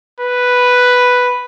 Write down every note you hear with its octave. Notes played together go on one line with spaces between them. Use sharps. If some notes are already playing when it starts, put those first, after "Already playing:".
B4